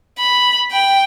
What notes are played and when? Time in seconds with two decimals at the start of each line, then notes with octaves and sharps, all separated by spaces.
0.19 B5
0.72 G5